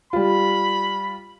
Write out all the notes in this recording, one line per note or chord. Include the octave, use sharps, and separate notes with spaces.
G3 F4 B5